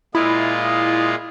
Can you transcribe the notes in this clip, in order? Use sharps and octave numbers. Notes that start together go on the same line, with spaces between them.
A#2 G#3 E4 F4 D#5